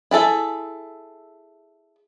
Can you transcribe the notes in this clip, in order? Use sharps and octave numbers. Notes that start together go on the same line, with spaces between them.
E4 G#4 A4 E5